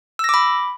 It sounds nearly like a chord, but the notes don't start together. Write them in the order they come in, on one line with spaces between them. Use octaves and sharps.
E6 A#6 D6 B5